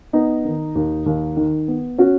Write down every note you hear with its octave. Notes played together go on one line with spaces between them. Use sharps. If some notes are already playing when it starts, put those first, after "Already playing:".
B3 D#4
D#3
D#2
D#2
D#3
B3
C#4 F#4